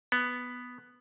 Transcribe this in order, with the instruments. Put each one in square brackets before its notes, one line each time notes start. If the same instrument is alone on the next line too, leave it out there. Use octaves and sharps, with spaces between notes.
[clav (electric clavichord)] B3